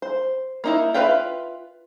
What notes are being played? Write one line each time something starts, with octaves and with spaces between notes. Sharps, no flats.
C5
A#3 D#4 E4
F4 B4 E5 F5 G5